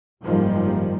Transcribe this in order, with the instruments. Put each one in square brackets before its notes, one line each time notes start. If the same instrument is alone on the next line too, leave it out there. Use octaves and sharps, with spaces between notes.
[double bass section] F#1 G#2 D#3 F3 G3 A#3